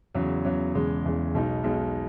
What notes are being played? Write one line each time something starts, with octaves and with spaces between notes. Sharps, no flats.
E2 C#3 F#3
E2 C#3 F#3
E1 E2 C#3 G#3
E1 E2 C#3 G#3
B1 B2 G#3 D#4
B1 B2 G#3 D#4